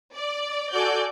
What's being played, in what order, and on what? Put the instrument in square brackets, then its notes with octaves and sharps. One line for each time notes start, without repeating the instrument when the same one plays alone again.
[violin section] D5
[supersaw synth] F#4 A4 G#5 [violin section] D5 G6